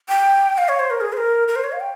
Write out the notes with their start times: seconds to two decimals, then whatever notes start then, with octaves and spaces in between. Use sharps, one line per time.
0.09 G5
0.58 F5
0.68 C#5
0.79 C5
0.90 A#4
1.01 G#4
1.13 C5
1.17 A#4
1.48 A#4
1.56 C5
1.64 C#5
1.72 F5
1.80 G5